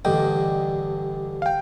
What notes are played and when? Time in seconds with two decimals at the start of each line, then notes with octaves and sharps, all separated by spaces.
0.05 A1 G2 D3 D#5 G5
1.42 F5
1.46 G5